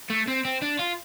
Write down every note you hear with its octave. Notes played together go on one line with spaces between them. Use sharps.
A3
C4
C4
D4
F4